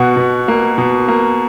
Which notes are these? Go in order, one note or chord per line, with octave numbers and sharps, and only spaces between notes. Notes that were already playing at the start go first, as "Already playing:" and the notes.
Already playing: B2 F#5
B2
A#3
B2
A#3